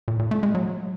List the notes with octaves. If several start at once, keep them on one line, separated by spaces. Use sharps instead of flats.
A#2
A#2
A3
G#3
F#3